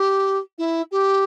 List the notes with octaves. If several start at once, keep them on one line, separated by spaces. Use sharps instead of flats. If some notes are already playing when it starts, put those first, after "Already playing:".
Already playing: G4
E4
G4